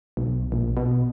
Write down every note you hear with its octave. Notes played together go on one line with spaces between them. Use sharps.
B1
A#1
B2